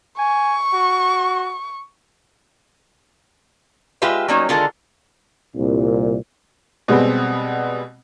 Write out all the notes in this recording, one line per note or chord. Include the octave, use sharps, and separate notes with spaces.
G#5 C#6
F#4
G#3 F4 G4 B4 E5 F5
F#3 G3 A#3 C#4 D#4
D3 D#3 G#3 F4 A4 A#4
C2 A#2
B2 G3 G#3 B3 C4